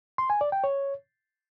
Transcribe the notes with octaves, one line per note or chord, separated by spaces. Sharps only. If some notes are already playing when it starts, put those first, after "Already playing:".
C6
G#5
D5
G5
C#5